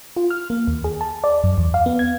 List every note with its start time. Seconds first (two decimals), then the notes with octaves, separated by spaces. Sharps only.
0.17 F4
0.30 F6
0.50 A#3
0.67 D#2
0.84 G#4
1.01 A5
1.24 D5
1.44 F#2
1.58 E2
1.74 F5
1.86 B3
1.99 G#6